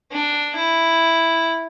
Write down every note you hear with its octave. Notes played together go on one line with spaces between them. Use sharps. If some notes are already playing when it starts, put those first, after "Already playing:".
D4
E4